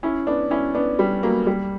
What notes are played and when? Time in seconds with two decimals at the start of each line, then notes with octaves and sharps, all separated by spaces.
0.03 C#4 E4
0.27 B3 D4
0.51 C#4 E4
0.75 B3 D4
0.99 G3
1.23 F#3 A#3
1.47 G3